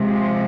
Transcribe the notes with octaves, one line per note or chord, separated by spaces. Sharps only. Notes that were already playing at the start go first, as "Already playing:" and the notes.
Already playing: C3 F3 G#3